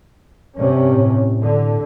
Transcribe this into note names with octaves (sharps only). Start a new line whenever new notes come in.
G2 C3 C#4
A2
D3